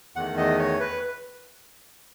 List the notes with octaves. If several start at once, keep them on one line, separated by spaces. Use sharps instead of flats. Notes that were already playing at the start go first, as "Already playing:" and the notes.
E2 D#3 A3 F#5
D#5
C#5
B4